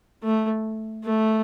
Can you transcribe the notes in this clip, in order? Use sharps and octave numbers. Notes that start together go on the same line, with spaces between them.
A3
A3